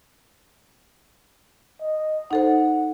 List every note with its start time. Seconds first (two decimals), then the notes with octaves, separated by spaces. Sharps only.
1.82 D#5
2.31 D#4 A4 C5 F#5